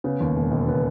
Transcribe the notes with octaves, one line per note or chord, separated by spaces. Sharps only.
C#3 B3
D#2
E1
E1
C#3 B3